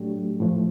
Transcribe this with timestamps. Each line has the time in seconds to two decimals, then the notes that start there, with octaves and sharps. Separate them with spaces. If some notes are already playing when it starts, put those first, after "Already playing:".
Already playing: A2 F#3 A3 D4 G4
0.40 A2 F3 A3